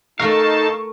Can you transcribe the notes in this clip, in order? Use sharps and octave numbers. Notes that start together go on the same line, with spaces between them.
A3 D#4 A4 A#4 F5 A5 C#6